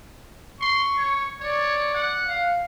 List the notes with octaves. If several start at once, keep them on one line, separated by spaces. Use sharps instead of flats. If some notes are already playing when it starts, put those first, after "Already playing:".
C6 C#6
C#5
C#5 D5
F#5
F5